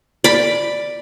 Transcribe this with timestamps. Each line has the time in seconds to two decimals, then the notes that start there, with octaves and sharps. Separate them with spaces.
0.24 D5 B5